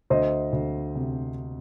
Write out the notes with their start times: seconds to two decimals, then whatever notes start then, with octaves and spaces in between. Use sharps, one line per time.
0.10 D2 C5 D#5
0.53 D2
0.95 C3